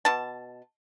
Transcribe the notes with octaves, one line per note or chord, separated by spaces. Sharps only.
B2 A5